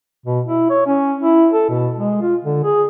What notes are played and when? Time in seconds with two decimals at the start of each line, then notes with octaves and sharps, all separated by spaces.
0.26 B2
0.47 E4
0.70 C#5
0.86 C#4
1.22 E4
1.53 A4
1.69 B2
1.98 G#3
2.21 F4
2.43 D3
2.64 G#4